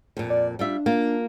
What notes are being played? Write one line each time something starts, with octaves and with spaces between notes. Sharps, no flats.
F2 A#2
D5
G3 D4 F4 E5
A#3 F4